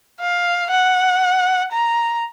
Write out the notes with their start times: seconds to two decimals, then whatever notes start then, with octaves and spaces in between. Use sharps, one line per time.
0.20 F5
0.71 F#5
1.72 A#5